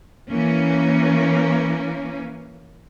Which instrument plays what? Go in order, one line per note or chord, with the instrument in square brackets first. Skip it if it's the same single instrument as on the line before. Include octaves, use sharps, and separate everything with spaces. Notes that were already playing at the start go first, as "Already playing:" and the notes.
[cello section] E3 A#3 C#4